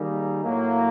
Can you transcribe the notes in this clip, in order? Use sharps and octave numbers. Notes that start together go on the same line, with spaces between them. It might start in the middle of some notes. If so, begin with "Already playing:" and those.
Already playing: D#3 G3 A#3 D#4 G#4
A2 F#3 A#3